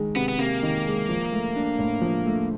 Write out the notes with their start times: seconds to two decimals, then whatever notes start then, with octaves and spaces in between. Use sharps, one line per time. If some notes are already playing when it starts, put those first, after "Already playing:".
Already playing: D#3 G#3
0.15 C3 B3
0.28 B3
0.38 C3 A#3
0.63 D#3
0.86 G#3
1.09 F3
1.32 A3
1.56 D4
1.79 A2
2.02 F3
2.26 A3